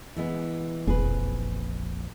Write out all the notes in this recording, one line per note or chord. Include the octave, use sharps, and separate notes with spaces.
E3 G#3 B3
E1 A#1 F2 G#4 B4